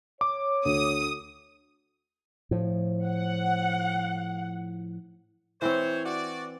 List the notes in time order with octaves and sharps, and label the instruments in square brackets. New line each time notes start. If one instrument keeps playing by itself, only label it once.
[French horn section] C#5 [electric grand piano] D6
[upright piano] D2 [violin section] D#6
[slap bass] A2 F3
[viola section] F#5
[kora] E3 C4 [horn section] C5 C#5
[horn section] F#4 D5